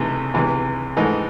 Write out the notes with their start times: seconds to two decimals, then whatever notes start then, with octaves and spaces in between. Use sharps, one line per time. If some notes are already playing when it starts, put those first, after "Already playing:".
Already playing: C#2 C3 E3 A3 D#4
0.34 C#2 C3 E3
0.97 G#2 E3 A3 D#4